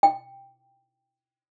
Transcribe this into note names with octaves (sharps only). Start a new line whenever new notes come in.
G5